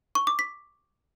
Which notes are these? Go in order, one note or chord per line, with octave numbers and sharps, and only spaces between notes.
C#6
D6
B6